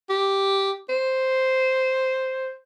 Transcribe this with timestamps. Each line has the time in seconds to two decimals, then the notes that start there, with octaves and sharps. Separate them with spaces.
0.10 G4
0.89 C5